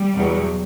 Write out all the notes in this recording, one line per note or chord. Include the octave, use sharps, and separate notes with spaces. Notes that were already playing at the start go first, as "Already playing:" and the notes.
Already playing: G3
E2 B2 F#3